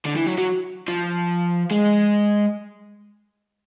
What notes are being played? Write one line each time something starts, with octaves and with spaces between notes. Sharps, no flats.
D3
E3
F#3
F#3
F3
G#3